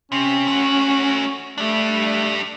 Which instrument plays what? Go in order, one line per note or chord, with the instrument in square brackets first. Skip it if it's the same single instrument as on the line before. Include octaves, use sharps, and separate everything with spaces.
[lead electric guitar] C3 [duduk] C#4
[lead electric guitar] A3 F#4
[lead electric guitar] G3 D4 [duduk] A3